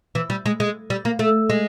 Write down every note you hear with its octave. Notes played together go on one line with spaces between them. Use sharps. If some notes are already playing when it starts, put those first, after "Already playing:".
E3
G3
G#3
G#3
G3
A#3
A3
G#3